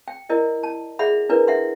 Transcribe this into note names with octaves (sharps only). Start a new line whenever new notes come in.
G5
E4 A#4 D5 D#5
A5
G#4 D5 E5 F#5 B5
D4 E4 A#4 B4 D5
D4 E5 F#5 C6